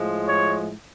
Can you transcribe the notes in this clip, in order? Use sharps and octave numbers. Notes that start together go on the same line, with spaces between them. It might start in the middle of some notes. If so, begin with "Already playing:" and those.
Already playing: A2 F3 G#3
C#5